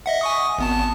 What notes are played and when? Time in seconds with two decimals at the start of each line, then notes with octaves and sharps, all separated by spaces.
0.06 D#5 E5 F#5
0.21 G#5 C#6 D#6
0.58 G#1 B3 A5